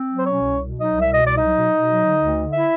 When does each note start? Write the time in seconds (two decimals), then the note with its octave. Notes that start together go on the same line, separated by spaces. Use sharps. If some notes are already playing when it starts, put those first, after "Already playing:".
Already playing: C4
0.09 F#3
0.19 C5
0.24 B2 C#4 C#5
0.41 C2
0.57 B2
0.73 F#3
0.79 D#4 D#5
0.90 C2
1.00 E5
1.06 B2
1.12 D#5
1.22 C2 D5
1.37 F#3 D#4 D#5
1.55 B2
1.71 B2
1.87 F#3
2.04 D3
2.20 D2
2.37 D3
2.52 E4 E5